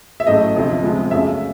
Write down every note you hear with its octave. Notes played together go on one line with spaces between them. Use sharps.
E5
A1 A2 F#3 A3 D#5
D2 C3 F3
C#2 C3 F3 G#3
F#2 C#3 F#3 A3 E5